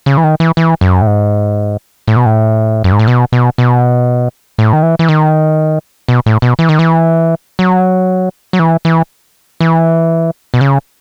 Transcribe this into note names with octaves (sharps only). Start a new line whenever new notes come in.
C#3
E3
D#3
E3
E3
F#2
A2
G#2
A2
B2
A2
F#2
G#2
A2
B2
B2
B2
A2
D#3
E3
E3
D#3
B2
A2
B2
E3
D#3
E3
F#3
F#3
E3
E3
E3
B2
C#3